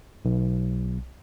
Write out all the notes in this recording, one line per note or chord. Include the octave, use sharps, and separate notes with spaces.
B1